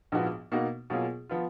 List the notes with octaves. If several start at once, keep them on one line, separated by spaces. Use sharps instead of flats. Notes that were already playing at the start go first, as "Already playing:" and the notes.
A#1 G#2 F3 B3 F#4
B2 A#3 D#4 F#4
B2 F#3 A#3 F4 G#4
F3 B3 F4